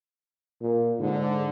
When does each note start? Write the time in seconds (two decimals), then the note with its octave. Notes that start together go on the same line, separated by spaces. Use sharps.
0.61 A#2
0.99 G#2 D3